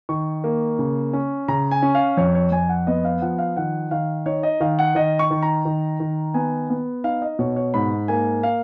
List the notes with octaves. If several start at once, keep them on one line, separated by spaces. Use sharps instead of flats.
D#3 C#6
A#3
C#3
C#4
C#3 A#5
G#5
C#4
F5
F2 C#5
C#5
F2 G#5
F#5
B3 D#5
F5
F3 F#5
F5
D#3 F#5
D#3 F5
D#4 C#5
D#5
D#3 F5
F#5
D#3 D#5
C#6
D#3
A#5
D#3
D#3
B3 G#5
B3
D#4 F5
D#5
B2 C#5
C#5
G#2 B5
A#3 G#5
F5